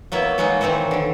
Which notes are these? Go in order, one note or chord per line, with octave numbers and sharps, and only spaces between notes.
F#3 A#3 B3 E4
F#3 G#3 A#3 B3 D#4
D#3 E3 F#3 C4 F#4
D3 D#3